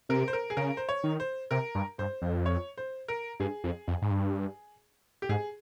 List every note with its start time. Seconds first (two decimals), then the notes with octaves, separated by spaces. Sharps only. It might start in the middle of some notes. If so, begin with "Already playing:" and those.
0.09 C3 A#4
0.28 C5
0.33 A#4
0.50 G#4
0.57 C#3 A#4
0.77 C5
0.89 C#5
1.03 D#3
1.20 C5
1.51 C3 A#4
1.75 G2
1.98 G2 C5
2.22 F2
2.46 C#5
2.78 C5
3.08 A#4
3.40 G2 G#4
3.64 F2
3.88 F2
4.02 G#2
4.11 G2
5.22 G4
5.29 G#2 G#4